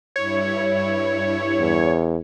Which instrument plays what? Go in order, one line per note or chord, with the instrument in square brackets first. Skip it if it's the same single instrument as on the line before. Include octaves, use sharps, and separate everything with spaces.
[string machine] G2 E4 [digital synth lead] C#5
[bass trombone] E2